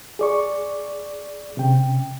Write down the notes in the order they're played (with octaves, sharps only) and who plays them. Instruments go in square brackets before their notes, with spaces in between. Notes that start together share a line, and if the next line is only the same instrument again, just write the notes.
[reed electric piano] G#4 D5 C#6
C3 C#4 G5